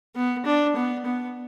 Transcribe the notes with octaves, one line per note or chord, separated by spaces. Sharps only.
B3
D4
B3
B3